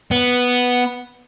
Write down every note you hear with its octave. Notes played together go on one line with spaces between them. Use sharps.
B3